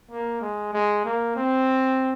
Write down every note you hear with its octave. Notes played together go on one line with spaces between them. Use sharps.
A#3
G#3
G#3
A#3
C4